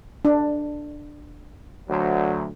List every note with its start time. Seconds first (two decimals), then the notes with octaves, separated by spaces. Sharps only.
0.25 D4
1.89 D2 F#3